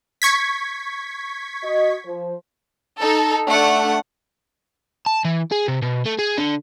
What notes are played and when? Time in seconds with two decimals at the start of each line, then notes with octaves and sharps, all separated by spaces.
0.22 C#6 G#6 B6
1.63 F#4 D#5
2.05 F3 C5
2.99 D#4 A4
3.47 A3 D4 F#5
5.06 A5
5.25 E3
5.51 G#4
5.68 C3
5.82 B2
6.06 A3
6.19 G#4
6.38 D3